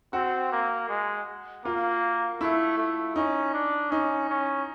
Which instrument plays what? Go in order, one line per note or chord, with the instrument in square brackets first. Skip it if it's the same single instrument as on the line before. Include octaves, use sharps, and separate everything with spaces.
[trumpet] C4 [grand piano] F#4
[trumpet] A#3
G#3
[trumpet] A#3 [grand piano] F4
[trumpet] A3 [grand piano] E4
[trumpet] A3
[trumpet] C#4 [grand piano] D#4
[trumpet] D4
[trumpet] C#4 [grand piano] D#4
[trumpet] C#4